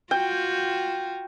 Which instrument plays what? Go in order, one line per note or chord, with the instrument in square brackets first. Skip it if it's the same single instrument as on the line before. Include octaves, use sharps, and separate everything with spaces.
[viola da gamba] F4 F#4 [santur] G5